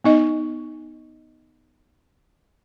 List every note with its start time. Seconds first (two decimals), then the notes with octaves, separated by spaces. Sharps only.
0.04 B3 D#4 D#5